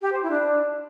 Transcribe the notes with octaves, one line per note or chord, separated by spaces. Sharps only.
G4
C5
E4
D4